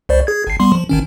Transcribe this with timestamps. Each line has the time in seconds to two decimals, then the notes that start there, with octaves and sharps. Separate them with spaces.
0.09 C2 C5 D5
0.27 G#4 G#6
0.47 G#1 C7
0.60 G3 B3 C6
0.72 F3
0.89 G#1 D#3 C#4